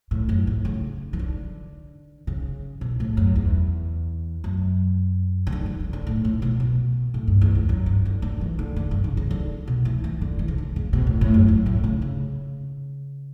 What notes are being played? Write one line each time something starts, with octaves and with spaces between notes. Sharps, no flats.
A2
F#2
A2
C#3
E3
D3
C#3
B2
A2
F#2
E2
F#2
C#3
D3
E3
D3
D3
A2
A2
B2
B2
A2
G2
E2
E2
F#2
G2
D3
D3
E3
D3
D3
G2
C#3
C#3
D3
B2
E3
E3
D3
E3
C#3
D3
C#3
B2
A2
A2
F#2
F#2
A2
C#3
C#3